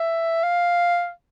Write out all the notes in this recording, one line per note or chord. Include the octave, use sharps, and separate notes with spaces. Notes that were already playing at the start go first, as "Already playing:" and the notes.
Already playing: E5
F5